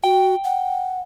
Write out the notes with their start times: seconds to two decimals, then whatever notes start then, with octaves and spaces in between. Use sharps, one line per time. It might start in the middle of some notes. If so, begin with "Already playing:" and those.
0.04 F#4 G5
0.44 F#5